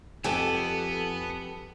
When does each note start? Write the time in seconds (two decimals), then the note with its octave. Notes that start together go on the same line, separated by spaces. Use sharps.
0.24 F2 B3 G4 A4 G#5